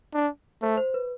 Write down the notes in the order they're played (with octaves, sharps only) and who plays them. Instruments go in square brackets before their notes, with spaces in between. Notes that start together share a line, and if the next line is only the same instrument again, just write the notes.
[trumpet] D4
[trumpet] A3 [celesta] C5
[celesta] C5
B4